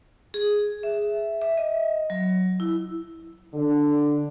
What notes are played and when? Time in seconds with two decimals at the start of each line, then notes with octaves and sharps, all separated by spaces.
0.34 G#4
0.83 E5
1.42 E5
1.57 D#5
2.10 F#3
2.60 E4
3.54 D3